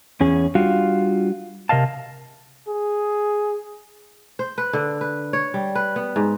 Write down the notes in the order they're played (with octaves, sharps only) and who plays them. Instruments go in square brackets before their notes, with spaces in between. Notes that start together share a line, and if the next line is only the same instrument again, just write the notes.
[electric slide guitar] E2 C#4 G#4
G3 D4 F4 F#4 F5
C3 A#4 D#5 F5 A5
[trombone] G#4
[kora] C5
B4
D3
B4
C#5
G3
B4
B3
G#2